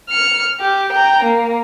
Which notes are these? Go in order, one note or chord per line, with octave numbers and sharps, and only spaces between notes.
F6 C#7
G4
G5 A#5
A#3